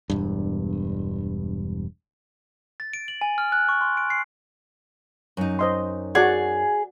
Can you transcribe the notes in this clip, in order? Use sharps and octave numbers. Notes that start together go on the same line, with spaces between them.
E1 G2
A6
D7
F#7
G#5
F6
F#6
C#6
C6
D7
C7
F#2 D#4
C5 D#5 C6
F#4 G#4 D5 F#5